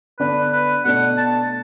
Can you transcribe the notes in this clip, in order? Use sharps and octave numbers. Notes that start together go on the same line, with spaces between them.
D3 B3 D4 B4
B4
B2 A3 D4 F#5
A5